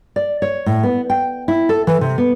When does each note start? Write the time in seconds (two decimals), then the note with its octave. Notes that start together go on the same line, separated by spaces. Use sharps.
0.16 D5
0.42 C#5
0.66 A2
0.83 B3
1.10 G5
1.48 E4
1.69 A4
1.87 E3
2.01 C3
2.18 B3